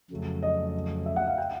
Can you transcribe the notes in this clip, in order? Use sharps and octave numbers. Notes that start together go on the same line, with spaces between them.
F2 C#3 F#3 A3
D#5
E5
F#5
F5
G5